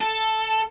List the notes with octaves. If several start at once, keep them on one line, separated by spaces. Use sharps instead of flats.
A4